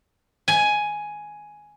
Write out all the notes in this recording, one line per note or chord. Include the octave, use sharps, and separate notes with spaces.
G#5